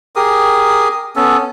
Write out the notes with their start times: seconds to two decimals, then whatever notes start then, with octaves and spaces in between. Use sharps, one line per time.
0.16 G4 G#4 A#4 D#6
1.16 B3 C#4 A4